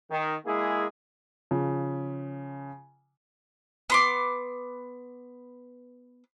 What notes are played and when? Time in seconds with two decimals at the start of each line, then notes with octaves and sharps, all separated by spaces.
0.10 D#3
0.45 G#3 A#3 E4 G#4
1.51 C#3 F3
3.90 B3 C6 D6